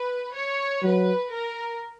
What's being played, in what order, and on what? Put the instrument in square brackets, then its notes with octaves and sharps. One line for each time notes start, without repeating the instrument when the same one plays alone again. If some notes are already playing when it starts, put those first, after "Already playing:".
Already playing: [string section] B4
C#5
[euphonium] F#3 [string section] B4
[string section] A#4